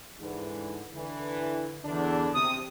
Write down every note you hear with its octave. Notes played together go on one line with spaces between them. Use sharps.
G#2 D3 E3
D3 E3
E2 D3 D4
C3 D#6